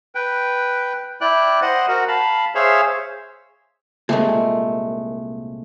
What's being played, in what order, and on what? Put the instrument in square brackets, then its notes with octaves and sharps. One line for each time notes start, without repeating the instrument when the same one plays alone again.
[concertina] B4 G5
E4 D5 G5 F#6
C5 D#5 F#5
F#4 A#4
F5 A5 B5
G#4 C5 C#5 E5 F5
[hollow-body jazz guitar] C2 A#2 [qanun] G#3 A3